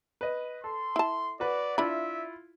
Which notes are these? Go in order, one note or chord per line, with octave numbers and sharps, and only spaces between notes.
B4 D#5
A4 C6
E4 A5
F#4 B4 D5
D4 E4 F4 E5 B5